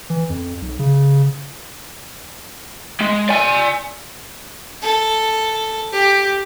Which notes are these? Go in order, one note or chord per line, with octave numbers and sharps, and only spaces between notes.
E3
F2
B1
C#3
G#3
D5 G#5
A4
G4